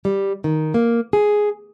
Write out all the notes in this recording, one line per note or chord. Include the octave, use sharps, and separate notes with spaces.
G3
D#3
A#3
G#4